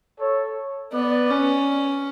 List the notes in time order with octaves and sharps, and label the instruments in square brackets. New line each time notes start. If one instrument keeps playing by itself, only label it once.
[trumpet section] A4 C#5
[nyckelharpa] B3 [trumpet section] B4 D5
[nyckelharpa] C#4